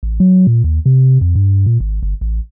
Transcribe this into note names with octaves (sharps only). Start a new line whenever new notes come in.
A1
F#3
A#2
D#2
C3
F2
G2
A#2
G#1
G1
A1